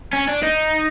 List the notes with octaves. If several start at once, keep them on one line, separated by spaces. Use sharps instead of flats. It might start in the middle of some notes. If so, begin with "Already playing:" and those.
C#4
D4
D#4